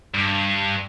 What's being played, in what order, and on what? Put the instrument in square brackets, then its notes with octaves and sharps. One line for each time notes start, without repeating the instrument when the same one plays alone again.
[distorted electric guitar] G2